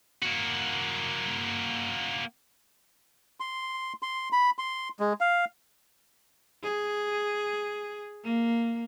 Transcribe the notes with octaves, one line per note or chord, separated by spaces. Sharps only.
A#3 F#4
C6
C6
B5
C6
G#3
F5
G#4
A#3